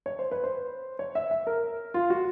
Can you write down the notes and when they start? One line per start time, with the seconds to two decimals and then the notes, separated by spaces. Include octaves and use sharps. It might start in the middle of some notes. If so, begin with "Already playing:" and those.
0.06 C#5
0.19 C5
0.31 B4
0.44 C5
0.99 C#5
1.15 E5
1.31 E5
1.47 A#4
1.94 F4
2.10 F#4